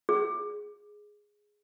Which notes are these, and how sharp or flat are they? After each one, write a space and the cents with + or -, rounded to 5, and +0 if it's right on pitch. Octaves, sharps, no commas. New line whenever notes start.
G#4 +0